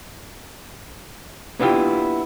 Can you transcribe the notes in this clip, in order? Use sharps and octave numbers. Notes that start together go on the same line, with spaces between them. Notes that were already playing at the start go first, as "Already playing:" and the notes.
A#3 B3 D4 E4 F4 G4